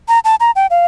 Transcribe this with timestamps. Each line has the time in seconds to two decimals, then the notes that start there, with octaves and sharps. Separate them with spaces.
0.08 A#5
0.25 A5
0.40 A#5
0.56 G5
0.70 F5